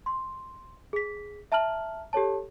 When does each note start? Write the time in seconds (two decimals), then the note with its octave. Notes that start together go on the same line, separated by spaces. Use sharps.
0.06 C6
0.93 G#4 B6
1.52 E5 A5 A#5 F6 F#7
2.13 G4 A4 C#5 A5